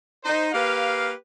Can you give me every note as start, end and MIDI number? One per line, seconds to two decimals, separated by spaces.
0.24 0.48 63
0.24 0.48 72
0.53 1.11 58
0.53 1.11 67
0.53 1.11 71
0.53 1.11 77